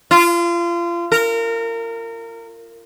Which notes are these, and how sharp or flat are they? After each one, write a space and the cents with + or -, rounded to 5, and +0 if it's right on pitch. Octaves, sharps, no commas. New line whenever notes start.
F4 -30
A#4 -25